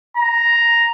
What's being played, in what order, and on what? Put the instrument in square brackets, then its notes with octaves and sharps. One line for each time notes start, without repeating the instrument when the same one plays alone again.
[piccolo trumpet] A#5